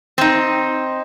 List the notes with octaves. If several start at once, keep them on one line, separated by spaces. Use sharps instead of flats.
C4 D#4